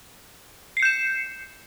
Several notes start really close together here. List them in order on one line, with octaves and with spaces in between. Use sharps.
C7 C#7 G6 E7